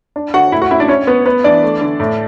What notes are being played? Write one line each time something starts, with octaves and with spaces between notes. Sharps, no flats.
D4
D3 F#4 F#5
A2 E4 E5
F#4 F#5
C#4 E4 E5
D4 D5
C#4 C#5
B3 C#4 B4
B3 B4
E3 D4 D5
A3
D3
A2